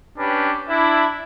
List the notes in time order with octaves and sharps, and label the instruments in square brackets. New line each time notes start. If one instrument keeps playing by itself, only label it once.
[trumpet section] C#4 D4 G4 B4
D4 E4